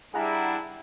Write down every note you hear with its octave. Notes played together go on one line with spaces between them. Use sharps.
G3 D4 E4 G#4 F#5 A#5